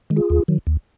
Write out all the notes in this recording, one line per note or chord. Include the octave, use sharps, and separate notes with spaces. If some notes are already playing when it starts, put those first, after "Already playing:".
D#3 G#3
F4 G#4
D#2
D#3 F#3
D#2